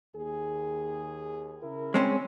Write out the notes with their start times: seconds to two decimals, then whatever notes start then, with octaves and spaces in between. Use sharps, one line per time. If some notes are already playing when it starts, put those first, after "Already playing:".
0.14 D#2 G#4
1.62 C#3 E4 A#4
1.94 G#3 C4 C#4